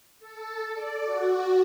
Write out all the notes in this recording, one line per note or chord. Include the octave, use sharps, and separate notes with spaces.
A4
D5
F#4